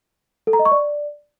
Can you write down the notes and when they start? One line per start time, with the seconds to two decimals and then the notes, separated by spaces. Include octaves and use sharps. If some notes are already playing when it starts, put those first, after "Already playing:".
0.47 A4
0.53 A#5
0.59 D#5
0.65 C#6
0.72 D5